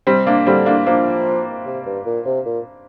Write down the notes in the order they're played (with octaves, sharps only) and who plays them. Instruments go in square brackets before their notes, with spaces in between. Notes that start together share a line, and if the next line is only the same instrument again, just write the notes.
[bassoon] C3 [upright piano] G3 C4
[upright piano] A#3 D4
[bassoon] D3 [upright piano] G3 C4
[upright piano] A#3 D4
[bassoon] F3 [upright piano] A#3 D4
[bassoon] C3
G2
A#2
C3
A#2